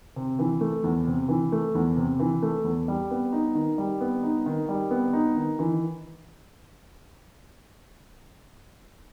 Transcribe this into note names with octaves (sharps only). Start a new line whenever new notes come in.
C3
E3
A3
E2
C3
E3
A3
E2
C3
E3
A3
E2
G3
B3
D#4
D#3
G3
B3
D#4
D#3
G3
B3
D#4
D#3
E3